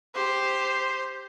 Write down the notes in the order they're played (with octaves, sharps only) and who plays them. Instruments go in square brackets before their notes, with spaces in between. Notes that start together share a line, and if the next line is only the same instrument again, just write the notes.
[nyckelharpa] G4 [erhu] C5